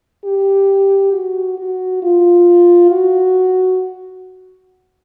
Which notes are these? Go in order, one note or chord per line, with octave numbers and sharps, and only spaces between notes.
G4
F#4
F#4
F4
F#4